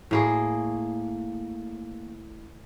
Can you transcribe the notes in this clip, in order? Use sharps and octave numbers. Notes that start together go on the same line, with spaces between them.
A2 A#3 G#4